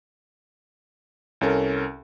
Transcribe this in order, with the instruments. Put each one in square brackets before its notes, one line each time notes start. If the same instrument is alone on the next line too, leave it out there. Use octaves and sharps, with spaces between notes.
[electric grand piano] C2 C#4 A4 A#4